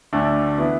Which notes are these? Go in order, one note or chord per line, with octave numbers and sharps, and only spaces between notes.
D2 D3 A3 D4
E3 B3 E4